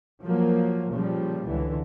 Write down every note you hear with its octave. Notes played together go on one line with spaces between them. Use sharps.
F3 F#3 A#3
A#2 C#3 F3 G3
C#2 D3 E3